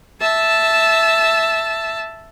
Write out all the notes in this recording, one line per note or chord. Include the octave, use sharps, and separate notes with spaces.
E5 A5